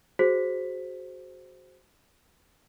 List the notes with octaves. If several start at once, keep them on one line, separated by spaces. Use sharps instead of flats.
F#4 G#4 C5 B6